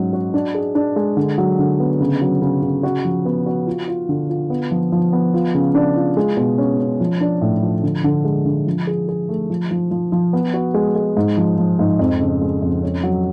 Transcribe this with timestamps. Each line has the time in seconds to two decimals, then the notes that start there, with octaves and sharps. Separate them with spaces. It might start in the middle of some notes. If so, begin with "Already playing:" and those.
Already playing: G#2 F#3 C#4
0.13 F#4
0.34 D4
0.55 G#4
0.75 D4
0.96 G#3
1.17 D3
1.38 F#3
1.59 D3
1.80 B3
2.00 C#3
2.21 F#3
2.42 C#3
2.62 C#3
2.83 F#4
3.05 F3
3.25 B3
3.46 F#4
3.67 F4
3.88 F4
4.09 D3
4.29 F4
4.50 B3
4.71 F3
4.92 F3
5.13 B3
5.34 F4
5.55 C#3
5.75 D4
5.96 F4
6.17 G#3
6.37 B2
6.58 C#4
6.79 C#4
7.00 F3
7.21 D4
7.41 A2
7.62 F3
7.83 D3
8.04 D3
8.25 G#3
8.46 D3
8.67 F3
8.87 G#4
9.08 G#4
9.29 A3
9.50 F3
9.71 F3
9.91 F3
10.12 F3
10.33 B3
10.54 F#4
10.74 G#3
10.95 G#3
11.17 G#2
11.37 F3
11.58 F3
11.79 G#2
11.99 F2
12.21 C#3
12.42 G#3
12.62 F2
12.83 C#4
13.03 F#3